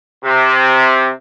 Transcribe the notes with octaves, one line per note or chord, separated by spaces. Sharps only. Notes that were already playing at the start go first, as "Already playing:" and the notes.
C3